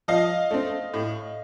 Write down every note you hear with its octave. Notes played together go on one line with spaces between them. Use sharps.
F3 D#5 F5
A3 C4
A2